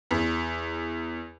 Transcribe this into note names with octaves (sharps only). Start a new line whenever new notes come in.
E2